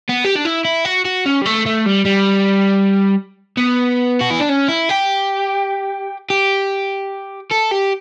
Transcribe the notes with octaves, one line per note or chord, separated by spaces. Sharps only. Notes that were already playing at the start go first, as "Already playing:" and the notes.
B3
G4
D4
E4
E4
F#4
F#4
C#4
G3
A3
A3
G3
G3
B3
F#4
E4
D4
C#4
E4
G4
G4
A4
G4